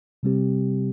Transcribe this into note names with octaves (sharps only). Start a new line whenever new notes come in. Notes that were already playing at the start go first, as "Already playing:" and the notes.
C3 G3 C4 G4